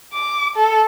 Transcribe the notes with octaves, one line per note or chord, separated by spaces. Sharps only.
D6
A4